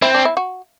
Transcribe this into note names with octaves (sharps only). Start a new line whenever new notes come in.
C4 E4
D4
E4
F#4